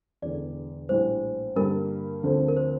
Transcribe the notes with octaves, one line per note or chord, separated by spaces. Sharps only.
E1 E2 D3 D5
A#1 A2 E3 G3 C5
G2 D3 G3 A#3 A#4
D2 D3 F3 C4
A#4
C5